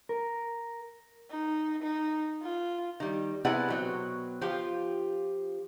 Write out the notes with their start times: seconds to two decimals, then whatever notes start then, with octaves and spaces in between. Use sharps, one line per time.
0.09 A#4
1.31 D#4
1.83 D#4
2.43 F4
3.00 D#3 G3
3.45 C3 B3 E4 G#4 D5 F#5
3.68 B2 F#3 C4
4.42 F3 F4 G4